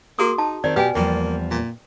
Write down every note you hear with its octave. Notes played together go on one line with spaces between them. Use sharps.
A#3 F#4 G#4 D#6
D#4 A5
D#3 C4 D5
B2 B3 G4 B4 G5 G#5
E2 F3 G3 A#3
A#2